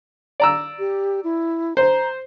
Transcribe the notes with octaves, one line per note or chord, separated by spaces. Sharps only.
D5 A#5 E6
G4
E4
C5 A#5